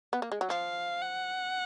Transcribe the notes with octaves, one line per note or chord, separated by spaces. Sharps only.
B3
A#3
G#3
F#3
F3 F5
F#5